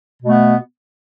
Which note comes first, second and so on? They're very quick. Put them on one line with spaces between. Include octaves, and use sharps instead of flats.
B2 A3 B3